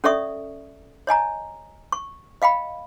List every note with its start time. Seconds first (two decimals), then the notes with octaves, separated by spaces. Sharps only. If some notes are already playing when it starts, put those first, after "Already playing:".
0.04 C#4 A4 D5 E5 C#6 D#6
1.07 C#5 D#5 G#5 A#5
1.92 C#6
2.42 D#5 F5 G5 B5